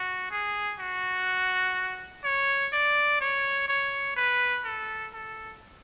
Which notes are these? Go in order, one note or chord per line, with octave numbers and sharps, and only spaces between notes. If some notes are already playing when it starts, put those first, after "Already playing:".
Already playing: F#4
G#4
F#4
C#5
D5
C#5
C#5
B4
A4
A4